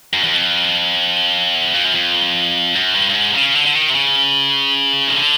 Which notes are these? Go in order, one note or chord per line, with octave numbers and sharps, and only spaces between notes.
F#2
E2
F2
E2
F2
F#2
F2
F#2
G2
G2
G#2
C3
C#3
D3
D3
D#3
C3
C#3
D#3
D3